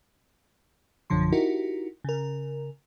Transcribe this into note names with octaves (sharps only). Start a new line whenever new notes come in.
A#1 F#2 D3 F3 C6
D#4 E4 F#4 G4 A#4
C#3 A#4